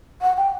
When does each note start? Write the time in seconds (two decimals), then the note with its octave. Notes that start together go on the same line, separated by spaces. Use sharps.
0.22 F#5
0.37 G5